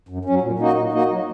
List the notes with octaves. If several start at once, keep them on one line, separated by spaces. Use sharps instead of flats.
F#2
F#3 C#4
A#2
A#3 D#4 F#4 D#5
A#2
A#3 D#4 F#4 D#5
F#3